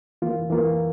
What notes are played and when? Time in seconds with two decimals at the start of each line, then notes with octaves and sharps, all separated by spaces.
0.22 E3 A#3 F4
0.50 E3 A#3 F4